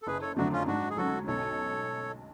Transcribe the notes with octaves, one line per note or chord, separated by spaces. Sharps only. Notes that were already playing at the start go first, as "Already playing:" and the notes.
A4
F#1 G#4 B4
A4 C#5
F2 D3 F#3 A3 D4 F#4
C#4 F4
G#2 D4 F#4
G#4
F#3 C#4 F#4 A4
B1 A4 C#5